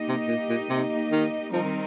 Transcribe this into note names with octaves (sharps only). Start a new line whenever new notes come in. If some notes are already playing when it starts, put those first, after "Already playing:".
Already playing: A#3 D#4 G4 D#5
C3
A#2
A#2
C3
D#3
D#3 F3 G3 C4 D#4 A#4